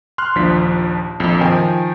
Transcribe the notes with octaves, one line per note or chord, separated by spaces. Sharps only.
C6 F6 F#6
A#1 D#2 F3 D4 B6
A#1 F2
D#3 F3 G5 G#5